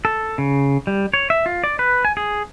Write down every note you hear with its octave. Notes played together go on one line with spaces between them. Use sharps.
A4
C#3
G3
C#5
E5
F4
D5
B4
G#5
G#4